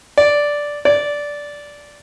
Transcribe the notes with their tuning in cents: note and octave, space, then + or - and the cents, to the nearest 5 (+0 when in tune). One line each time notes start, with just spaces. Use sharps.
D5 -5
D5 -10